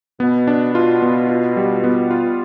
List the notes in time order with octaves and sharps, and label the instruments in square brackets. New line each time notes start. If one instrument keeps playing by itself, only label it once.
[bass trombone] B2 [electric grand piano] B3
[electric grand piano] D4
[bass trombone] B2 [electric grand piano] F4
[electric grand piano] B3
F4
G3
B3
F4